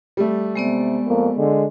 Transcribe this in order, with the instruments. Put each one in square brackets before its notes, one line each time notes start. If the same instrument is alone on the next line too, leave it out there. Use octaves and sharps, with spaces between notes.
[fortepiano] G3 A3
[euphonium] C3 [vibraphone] G#3 B3 D5
[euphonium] F2 [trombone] A#3
[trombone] D3 [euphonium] G#3